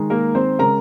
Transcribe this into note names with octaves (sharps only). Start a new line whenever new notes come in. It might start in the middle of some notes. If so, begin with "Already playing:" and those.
Already playing: D#3 G#3
A#3 A#4
C4 C5
C#3 G#3 A#4 A#5